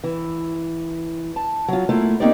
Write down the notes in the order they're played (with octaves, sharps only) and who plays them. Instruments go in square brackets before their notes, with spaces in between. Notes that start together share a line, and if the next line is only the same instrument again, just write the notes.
[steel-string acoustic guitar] E3
A5
F#3 F4
A3 A#3 E4 F4
A#3 C4 D#4 G4 A#4 D5